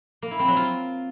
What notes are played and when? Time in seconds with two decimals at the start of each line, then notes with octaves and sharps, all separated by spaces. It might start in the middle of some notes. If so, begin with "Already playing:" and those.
0.22 A#3
0.31 E4
0.40 C4
0.48 F#3
0.57 F4